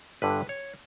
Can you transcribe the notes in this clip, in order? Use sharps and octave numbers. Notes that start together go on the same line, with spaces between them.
G1 G2 D3 B4
C#5